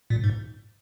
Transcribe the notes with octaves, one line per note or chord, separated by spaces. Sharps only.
A#2
G#2